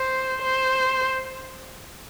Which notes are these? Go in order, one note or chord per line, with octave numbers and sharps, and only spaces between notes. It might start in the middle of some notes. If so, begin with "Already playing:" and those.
Already playing: C5
C5